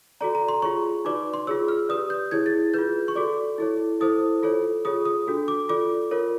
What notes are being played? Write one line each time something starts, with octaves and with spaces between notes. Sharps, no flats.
F#4 A4 D5 A#5
A#5
C6
F4 G#4 C#5 C#6
D#4 F#4 B4 D5 D6
C6
F4 G#4 C#5 E6
F6
G4 B4 D5 D#6
G6
E4 G#4 C#5 G#6
A6
F4 G#4 B4 G6
C#6
F#4 A4 D5 D6
E4 A4 C#5
E4 A4 C5 D#6
F4 A4 C#5
F4 G#4 C#5 D#6
D#6
D4 F#4 A4
D6
F4 A4 D5 D6
F4 A#4 C#5